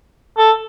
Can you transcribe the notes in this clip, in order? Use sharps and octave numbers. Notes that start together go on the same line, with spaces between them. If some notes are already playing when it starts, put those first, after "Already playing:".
A4